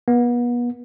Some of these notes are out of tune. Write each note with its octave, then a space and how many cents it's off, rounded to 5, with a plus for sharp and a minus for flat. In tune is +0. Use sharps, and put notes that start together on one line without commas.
B3 -35